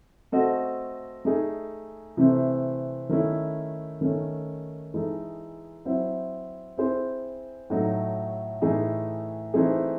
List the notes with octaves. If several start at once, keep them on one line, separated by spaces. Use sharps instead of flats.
A3 C4 F#4 A4 D#5
A3 D#4 G#4
C3 E3 A3 C4
D#3 A3 C#4 E4
D#3 A3 C#4
E3 G#3 D#4 A4
F#3 C4 E4 C5 E5
C4 E4 G#4 C5
A2 F#3 A3 D#4 F#4
A2 E3 A3 D#4 G#4
E3 A3 C4 D#4 G#4